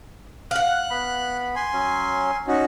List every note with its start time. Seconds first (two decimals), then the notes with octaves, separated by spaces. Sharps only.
0.51 F5 F#5 F#6
0.90 B3 B5
1.56 G#5 C6
1.73 F#3 C#4
2.48 C#4 D#4 F#4